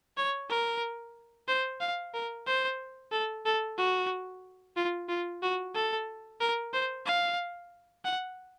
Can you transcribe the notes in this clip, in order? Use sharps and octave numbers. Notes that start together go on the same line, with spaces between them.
C#5
A#4
C5
F5
A#4
C5
A4
A4
F#4
F4
F4
F#4
A4
A#4
C5
F5
F#5